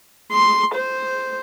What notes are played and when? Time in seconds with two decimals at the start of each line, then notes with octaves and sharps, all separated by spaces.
0.32 C6
0.75 C5